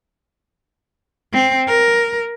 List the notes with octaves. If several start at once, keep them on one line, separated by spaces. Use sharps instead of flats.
C4
A#4